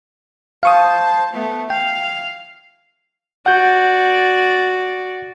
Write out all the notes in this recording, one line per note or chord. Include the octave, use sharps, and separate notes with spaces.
C5 F5 A5 C#6 D#6
A3 B3
F5 G5
F#4 D5 F#5 G6